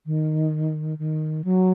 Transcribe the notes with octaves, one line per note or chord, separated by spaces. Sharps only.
D#3
D#3
F#3